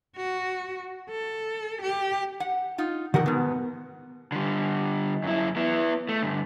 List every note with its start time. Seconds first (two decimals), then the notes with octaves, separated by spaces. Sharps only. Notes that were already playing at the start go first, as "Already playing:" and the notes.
0.16 F#4
1.10 A4
1.82 G4
2.40 F#5
2.78 D#4 F4
3.14 E2 D#3 G4 A#4 F#5
3.26 G#2 B2 B3
4.32 D3 G3
5.24 F#2 E4
5.56 B3 E4
6.09 A3
6.23 G2 D3